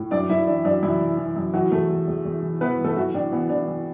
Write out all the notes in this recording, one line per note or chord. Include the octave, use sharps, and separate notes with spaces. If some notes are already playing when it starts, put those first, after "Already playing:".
Already playing: A2
F#2 D4 D5
F#2 E4 E5
E3 D4
F#2 D4
F#2 E3 E4
E3
E3
F#2
E3 F#3 F#4
E2 A3 A4
E2
E2
E2
E3
E3 B3 B4
E3
A3 A4
E3 F#3 F#4
A2 D4
E3 B3
E3 D4
E3